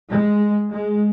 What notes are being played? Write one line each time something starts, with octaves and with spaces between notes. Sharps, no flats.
G#3
G#3